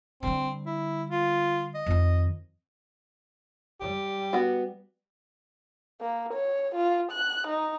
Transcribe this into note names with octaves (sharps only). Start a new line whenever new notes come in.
D3 G3 C4
E4
F4
D#5
F2 D#3
G3 G4
B3 F#4
A#3
C#5
F4
F#6
D#4